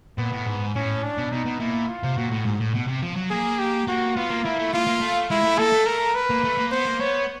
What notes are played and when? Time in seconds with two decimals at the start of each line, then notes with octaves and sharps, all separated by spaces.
0.18 A#2 B3
0.32 A2
0.46 G#2
0.75 A2 C#4
1.03 D4
1.18 B2
1.32 B2 D#4
1.46 B2
1.60 A#2 E4
1.88 F4
2.04 C3
2.17 A#2 F#4
2.31 A2
2.45 G#2
2.60 A2
2.75 B2
2.88 C3
3.03 F3
3.16 F#3
3.30 A#3 G#4
3.59 G4
3.88 A#3 F#4
4.16 B3 F4
4.30 A#3
4.44 A#3 E4
4.59 A3
4.73 A#3 F4
4.87 A#3
5.01 A3
5.30 G#3 E4
5.44 A3
5.58 A#3 A4
5.72 A3
5.86 A#4
6.15 B4
6.30 A#3
6.44 A3
6.58 A#3
6.71 B3 C5
6.86 A#3
7.00 B3 C#5